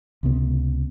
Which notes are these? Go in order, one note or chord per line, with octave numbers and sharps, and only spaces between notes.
C#2 C3 B3